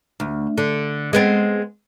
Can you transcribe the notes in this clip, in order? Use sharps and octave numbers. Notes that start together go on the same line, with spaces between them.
D2
D3
G#3 B3 C4